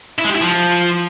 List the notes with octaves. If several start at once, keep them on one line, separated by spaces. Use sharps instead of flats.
E4
G#3
G4
E4
F3